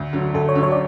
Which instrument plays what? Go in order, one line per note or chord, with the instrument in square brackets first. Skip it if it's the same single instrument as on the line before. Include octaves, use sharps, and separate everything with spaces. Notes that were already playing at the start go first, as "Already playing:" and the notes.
Already playing: [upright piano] D2
D3 F#3
[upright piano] D2 [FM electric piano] A4
[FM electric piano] C#5
[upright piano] D3 F#3
[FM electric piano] C#5
D5